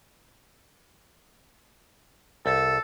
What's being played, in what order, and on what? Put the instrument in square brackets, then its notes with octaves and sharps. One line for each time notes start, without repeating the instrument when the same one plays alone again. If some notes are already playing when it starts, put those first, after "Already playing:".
[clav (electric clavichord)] C2 [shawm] A4